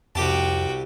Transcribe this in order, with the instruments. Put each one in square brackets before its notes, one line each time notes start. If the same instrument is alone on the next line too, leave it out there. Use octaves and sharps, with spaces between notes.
[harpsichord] C2 G4 A5 [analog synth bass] F2 [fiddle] F#4 G5